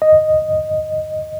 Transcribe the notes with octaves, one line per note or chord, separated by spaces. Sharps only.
D#5